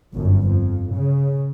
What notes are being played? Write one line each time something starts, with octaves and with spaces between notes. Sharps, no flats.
G1 F#2
F2
C#3